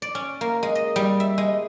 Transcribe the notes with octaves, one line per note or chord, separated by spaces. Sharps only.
D5
C#4
A#3
G#3
D#5
G3
E5
G#3